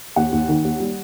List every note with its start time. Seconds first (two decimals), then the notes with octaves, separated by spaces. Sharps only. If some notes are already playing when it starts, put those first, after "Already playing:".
0.16 D#2 F#5
0.32 D#2
0.49 D#3
0.64 D#2
0.80 G3